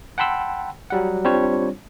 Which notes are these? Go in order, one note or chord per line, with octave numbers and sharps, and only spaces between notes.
F#5 G5 A5 B5 C6 E6
F#3 G3 F#5
G3 C4 D4 F4 C5 C#5